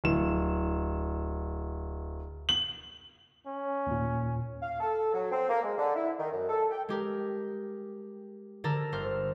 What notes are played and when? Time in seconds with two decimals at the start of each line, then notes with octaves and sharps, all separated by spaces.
0.04 D1 E7
2.49 F#7
3.47 C#4
3.87 D#2 A#2
4.62 F5
4.80 A4
5.14 F#3
5.31 C4
5.49 A#3
5.63 G#3
5.78 D3
5.96 E4
6.19 D#3
6.32 F#2
6.49 A4
6.70 G5
6.89 G#3 G4 A#4
8.64 D3 A4 A#4 A#5 A#6
8.92 G1 C5 C6 F6